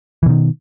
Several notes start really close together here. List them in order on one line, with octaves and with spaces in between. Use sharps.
E3 B2 D#3